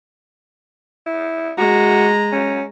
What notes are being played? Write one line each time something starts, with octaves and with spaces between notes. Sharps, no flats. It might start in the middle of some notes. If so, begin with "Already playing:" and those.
E4
G#3 F#4 A#5
C#4